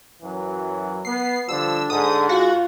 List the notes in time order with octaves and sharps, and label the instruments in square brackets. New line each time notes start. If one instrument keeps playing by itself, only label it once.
[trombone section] F#2 E3 F#3
[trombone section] B3 [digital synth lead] C7
[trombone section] D3 G3 D4 [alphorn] F3 [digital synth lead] E6
[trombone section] G#2 [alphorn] D3 [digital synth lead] D#6
[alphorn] F4 [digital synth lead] F#4